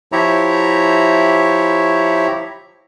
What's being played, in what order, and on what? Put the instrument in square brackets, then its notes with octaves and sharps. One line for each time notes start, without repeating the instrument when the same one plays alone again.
[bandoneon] F3 E4 G4 C#5 E5 A#5